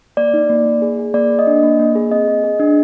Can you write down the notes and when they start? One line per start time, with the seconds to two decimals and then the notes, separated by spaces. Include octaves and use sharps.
0.17 A#3 D5
0.34 D#4
0.49 A#3
0.66 A#3
0.82 G#4
0.99 G#4
1.14 A#3 D5
1.30 A#3
1.39 D#5
1.47 D4
1.63 A#3
1.80 A#3
1.95 G#4
2.11 C4 D#5
2.28 G#4
2.44 G#4
2.60 D4